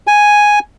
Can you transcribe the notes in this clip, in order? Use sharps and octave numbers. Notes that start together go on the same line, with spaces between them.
G#5